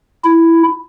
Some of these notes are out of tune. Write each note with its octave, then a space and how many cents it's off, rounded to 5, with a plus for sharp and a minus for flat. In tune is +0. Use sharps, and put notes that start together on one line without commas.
E4 +5